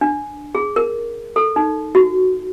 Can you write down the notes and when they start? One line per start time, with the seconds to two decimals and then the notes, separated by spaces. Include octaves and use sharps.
0.01 D4
0.55 G#4
0.76 A#4
1.36 A4
1.56 D#4
1.95 F#4